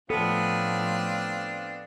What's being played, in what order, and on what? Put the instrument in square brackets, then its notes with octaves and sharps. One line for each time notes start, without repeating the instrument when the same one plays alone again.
[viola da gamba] A2 F3 [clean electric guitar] B3 [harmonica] C4 D4 F4 [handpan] A4